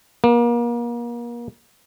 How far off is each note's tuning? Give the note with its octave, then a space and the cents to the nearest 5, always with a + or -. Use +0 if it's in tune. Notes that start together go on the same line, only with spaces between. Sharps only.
A#3 +35